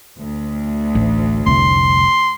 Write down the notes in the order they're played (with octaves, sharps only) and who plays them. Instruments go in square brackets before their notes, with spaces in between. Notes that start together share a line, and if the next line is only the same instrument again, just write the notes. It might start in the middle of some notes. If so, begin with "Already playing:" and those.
[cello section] D2
[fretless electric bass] A1
[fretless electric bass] F1 C2 D3 [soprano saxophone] C6